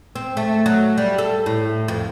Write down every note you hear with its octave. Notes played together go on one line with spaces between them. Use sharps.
C4
A3
F#3
G3
A4
A2
F2